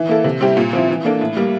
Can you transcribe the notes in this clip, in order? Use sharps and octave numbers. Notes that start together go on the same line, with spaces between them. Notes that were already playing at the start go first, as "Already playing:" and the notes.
Already playing: E3
A#3 E4 A4
C3
G3 C4 E4 G4
A#2
F3 C4 E4
E3
A#3 D4 A4
A2
G3 A#3